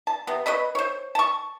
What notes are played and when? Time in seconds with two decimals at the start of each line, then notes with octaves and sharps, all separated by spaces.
0.07 A5
0.27 C3 B3
0.46 B4 C#5 D#5 B5
0.75 C5 C#5
1.15 A5 C#6